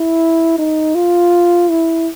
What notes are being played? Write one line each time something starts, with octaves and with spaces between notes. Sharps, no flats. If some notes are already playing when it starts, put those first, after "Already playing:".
Already playing: E4
D#4
F4
E4